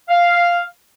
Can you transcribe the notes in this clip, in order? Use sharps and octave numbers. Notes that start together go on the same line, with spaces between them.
F5